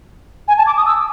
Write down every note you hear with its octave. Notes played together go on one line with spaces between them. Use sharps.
G#5
A5
D6
D#6
E6